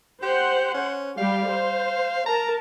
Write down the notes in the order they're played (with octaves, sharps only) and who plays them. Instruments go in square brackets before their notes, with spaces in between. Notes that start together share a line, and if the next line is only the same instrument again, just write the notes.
[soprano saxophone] G4 [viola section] C5 F#5
[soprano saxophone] C#4
[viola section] G3 G4 [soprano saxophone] F5
[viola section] C5
[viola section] A#4 A5 [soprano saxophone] A#5